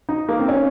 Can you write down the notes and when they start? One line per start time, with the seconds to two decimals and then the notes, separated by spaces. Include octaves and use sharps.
0.09 D#4
0.29 A#3
0.39 C4
0.49 C#4